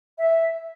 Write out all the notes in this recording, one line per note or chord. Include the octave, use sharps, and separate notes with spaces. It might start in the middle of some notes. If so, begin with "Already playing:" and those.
E5